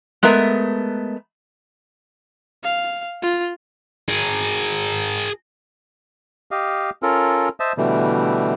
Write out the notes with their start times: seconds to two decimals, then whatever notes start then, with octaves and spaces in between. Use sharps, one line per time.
0.23 G#3 A3 B3 A#4 E5
2.64 F5
3.23 F4
4.09 G#4 A#4
6.51 G4 D#5 F5
7.03 C#4 F4 A4 A#4
7.60 C5 D#5 E5 A5
7.77 B2 D3 E3 G3 A3